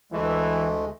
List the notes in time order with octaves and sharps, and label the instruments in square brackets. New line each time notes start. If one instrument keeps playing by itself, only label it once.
[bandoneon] D2 G#3 A3 [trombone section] E3